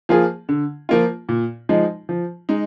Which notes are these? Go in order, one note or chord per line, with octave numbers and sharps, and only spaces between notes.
F3 A#3 F4 G#4
D3
F3 A#3 F4
A#2
F3 G#3 D#4
F3
G#3 D#4